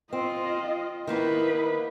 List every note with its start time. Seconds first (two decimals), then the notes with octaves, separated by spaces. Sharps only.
0.13 C4 F4 D#5
1.07 D#3 A#3 B3 E4 B4